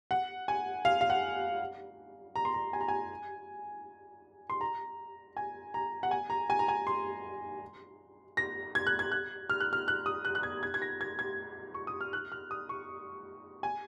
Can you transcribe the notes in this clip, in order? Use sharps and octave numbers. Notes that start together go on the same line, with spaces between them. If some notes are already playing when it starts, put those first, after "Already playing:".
F#5
G#5
F5
F5
F#5
A#5
C6
A#5
G#5
A#5
G#5
C6
A#5
G#5
A#5
F#5
G#5
A#5
G#5
A#5
G#5
C6
A#6
G#6
F#6
G#6
F#6
F6
F#6
F6
F#6
D#6
F#6
F#6
G#6
G#6
G#6
A#6
G#6
G#6
C#6
D#6
F6
F#6
F6
D#6
C#6
G#5